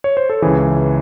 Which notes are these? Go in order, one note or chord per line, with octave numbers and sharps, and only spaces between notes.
C#5
C5
A4
C#2 C#3 E3 G#4